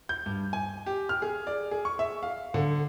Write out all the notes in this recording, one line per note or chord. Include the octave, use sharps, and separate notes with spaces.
G6
G2
G#5
G4
F6
G#4
D5
G#4
C#6
E5
F5
D3